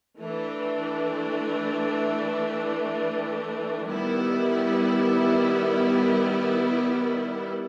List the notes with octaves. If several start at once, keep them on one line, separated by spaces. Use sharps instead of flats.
E3 A3 D4
D#3 G3 B3 E4